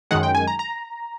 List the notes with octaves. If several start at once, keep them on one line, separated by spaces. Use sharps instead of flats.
F#2 D#3 G#3 F#5
G5
G#5
A#5
A#5